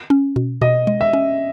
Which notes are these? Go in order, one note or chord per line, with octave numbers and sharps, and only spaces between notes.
C#4
B2
B2 D#5
G#3
E5
C#4